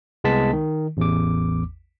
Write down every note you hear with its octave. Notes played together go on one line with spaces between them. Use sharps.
C2 G#3 B3 A5 B6
D#3
A1 E2 D6